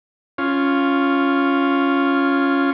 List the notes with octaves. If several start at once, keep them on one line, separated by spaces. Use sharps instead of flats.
C#4 F4